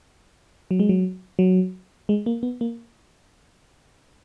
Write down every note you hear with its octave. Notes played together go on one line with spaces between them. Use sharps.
F#3
G#3
F#3
F#3
G#3
A#3
B3
A#3